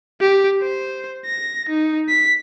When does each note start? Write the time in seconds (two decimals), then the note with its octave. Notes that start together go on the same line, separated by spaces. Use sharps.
0.21 G4
0.62 C5
1.26 A#6
1.69 D#4
2.09 B6